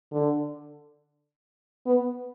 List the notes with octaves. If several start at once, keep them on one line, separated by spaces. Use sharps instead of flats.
D3
B3